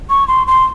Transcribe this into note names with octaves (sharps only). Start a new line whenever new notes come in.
C#6
C6
C6